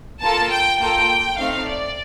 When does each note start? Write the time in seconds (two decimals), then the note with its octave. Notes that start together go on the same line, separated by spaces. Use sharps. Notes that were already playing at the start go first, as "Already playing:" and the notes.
0.22 A#3 F4 A4 A5
0.52 G5
0.80 A#3 F4 A4 G5
1.39 A3 C4 D#4 F5
1.68 D5